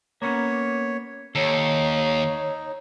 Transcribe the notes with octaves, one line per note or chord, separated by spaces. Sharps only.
A#3 B3 C#4 C#5
D#2 D#4 A4 C#5